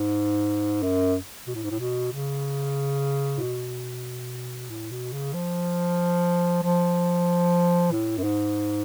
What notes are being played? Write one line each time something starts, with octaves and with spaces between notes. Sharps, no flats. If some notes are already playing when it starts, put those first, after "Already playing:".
Already playing: G#2
F#2
B2
A2
G#2
A2
B2
C#3
A2
B2
A2
B2
C#3
F3
F3
A2
F#2
G#2